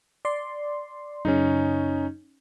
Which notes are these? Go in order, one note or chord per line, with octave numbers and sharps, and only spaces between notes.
D5 C6
F#2 C#3 C#4 D#4